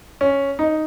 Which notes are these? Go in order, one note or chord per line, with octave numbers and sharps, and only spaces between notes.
C#4
D#4